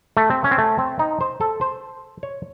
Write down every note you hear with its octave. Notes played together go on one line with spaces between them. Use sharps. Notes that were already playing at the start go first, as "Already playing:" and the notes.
A3
C4
C#4
C4
A3
C4
D#4
C5
A4
C5
C#5